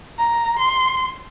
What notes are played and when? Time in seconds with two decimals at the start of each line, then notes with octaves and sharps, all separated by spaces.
0.18 A#5
0.59 C6